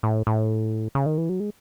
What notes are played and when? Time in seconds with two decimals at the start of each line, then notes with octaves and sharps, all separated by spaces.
0.03 A2
0.27 A2
0.95 C#3
1.06 D#3
1.18 E3
1.29 F#3
1.40 G#3